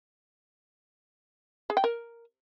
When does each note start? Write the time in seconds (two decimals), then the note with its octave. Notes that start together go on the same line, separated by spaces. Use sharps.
1.70 G#4
1.77 G5
1.84 A#4